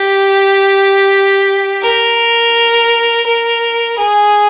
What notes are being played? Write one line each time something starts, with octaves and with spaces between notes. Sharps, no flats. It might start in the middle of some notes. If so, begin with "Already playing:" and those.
Already playing: G4
A#4
A#4
G#4